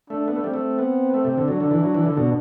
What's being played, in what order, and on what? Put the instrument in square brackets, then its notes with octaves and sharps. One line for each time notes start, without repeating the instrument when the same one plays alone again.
[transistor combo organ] A3 [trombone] D4
[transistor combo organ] B3
A3
[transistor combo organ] G3 [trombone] C4
[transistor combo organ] A3
B3
A3
C3
D3
[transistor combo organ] F#3 [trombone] D4
[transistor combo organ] D3
E3
F#3
E3
D3
B2